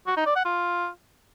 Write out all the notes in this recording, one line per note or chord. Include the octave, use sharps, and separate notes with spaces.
F#4
D#4
D5
F#5
F4